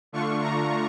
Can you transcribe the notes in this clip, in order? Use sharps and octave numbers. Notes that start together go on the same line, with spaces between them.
D3 A3 D4 F4 C#6
A#5